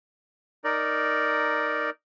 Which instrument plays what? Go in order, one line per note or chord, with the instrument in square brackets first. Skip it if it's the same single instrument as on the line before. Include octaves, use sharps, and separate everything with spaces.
[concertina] D#4 A#4 D5